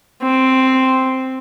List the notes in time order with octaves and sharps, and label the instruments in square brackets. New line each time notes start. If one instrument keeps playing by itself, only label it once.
[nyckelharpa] C4